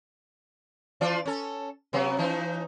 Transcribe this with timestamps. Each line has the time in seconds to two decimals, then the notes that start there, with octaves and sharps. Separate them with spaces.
1.01 E3 F4 D5
1.25 C#4 A4
1.93 C3 F#3 B3
2.18 E3 C#4 D#4